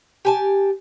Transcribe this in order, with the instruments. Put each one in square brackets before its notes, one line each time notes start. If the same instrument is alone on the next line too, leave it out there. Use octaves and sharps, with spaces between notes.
[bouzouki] G4 G#5 A5